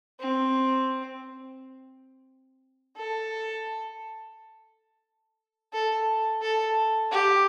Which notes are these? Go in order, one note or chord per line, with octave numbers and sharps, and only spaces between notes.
C4
A4
A4
A4
G4